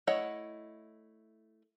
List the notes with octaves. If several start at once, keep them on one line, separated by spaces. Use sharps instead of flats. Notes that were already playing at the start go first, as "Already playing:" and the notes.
A3 E4 C#5 D#5 F#5